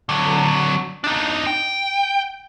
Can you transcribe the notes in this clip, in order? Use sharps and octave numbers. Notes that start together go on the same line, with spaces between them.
D3 F#3
D4 D#4
G5